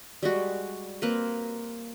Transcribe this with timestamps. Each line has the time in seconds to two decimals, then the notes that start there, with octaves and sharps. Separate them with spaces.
0.23 G3 G#3 F#4
1.02 A#3 C4 A#4 B4